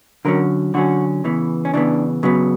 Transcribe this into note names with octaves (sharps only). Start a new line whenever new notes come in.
D3 F#3 C#4 A#4
D3 F#3 C#4 F#4
C#3 E3 B3
C#4
C#3 E3 B3 D4
C#3 F#3 B3